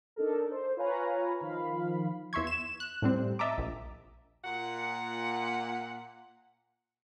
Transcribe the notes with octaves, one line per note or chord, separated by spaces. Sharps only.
D4 D#4 A4 A#4
C5
F4 B4 C#5 F5 G#5 A#5
D#3 F3 F5 B5
E2 E5 C6 C#6 G#6
E7
F#6
A2 G3 C4
D#5 E5 A5 A#5 D6
A#1
A#2 F#5